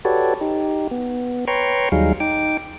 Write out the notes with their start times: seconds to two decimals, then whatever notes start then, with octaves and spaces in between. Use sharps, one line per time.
0.05 F#4 G4 A4 B4 C#5 D5
0.41 D#4 G4
0.91 B3
1.48 B4 C#5 G5 A#5 C6 C#6
1.92 D#2 F#3 G3 D#4 G#4 F5
2.20 D#4 G5 D6